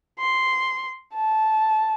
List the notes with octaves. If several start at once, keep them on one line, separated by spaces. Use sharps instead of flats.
C6
A5